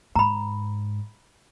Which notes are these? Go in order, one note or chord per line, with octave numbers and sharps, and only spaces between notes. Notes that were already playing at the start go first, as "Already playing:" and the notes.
G#2 A#5 B5